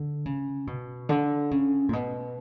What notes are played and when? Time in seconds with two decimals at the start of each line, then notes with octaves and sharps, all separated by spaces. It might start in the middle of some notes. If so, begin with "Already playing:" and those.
Already playing: D3
0.26 C#3
0.67 B2
1.09 D3
1.51 C#3
1.89 A#2
1.93 B2